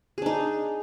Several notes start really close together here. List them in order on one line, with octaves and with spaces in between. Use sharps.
G#4 D4 D#4